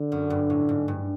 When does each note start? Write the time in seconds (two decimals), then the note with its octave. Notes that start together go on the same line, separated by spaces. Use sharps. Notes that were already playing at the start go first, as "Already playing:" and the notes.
Already playing: D3
0.12 F#2
0.30 G2
0.50 A2
0.69 G#2
0.88 G2